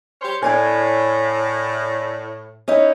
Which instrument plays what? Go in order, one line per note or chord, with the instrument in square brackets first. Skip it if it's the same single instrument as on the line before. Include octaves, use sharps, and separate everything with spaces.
[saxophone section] G4 C5 C#5
[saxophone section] A2 [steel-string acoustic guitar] D4 A#4 G#5
[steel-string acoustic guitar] C#4 D#4 E4